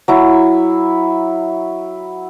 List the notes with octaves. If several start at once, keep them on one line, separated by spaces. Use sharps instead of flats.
F#3 E4